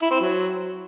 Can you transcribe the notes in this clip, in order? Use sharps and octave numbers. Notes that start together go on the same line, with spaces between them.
E4
C4
F#3